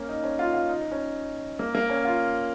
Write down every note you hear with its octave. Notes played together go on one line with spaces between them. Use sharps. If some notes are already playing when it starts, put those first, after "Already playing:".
Already playing: A#3 C#4
D#4
C#4
F4
F4
D#4
C#4
A#3
A#3
C#4
F4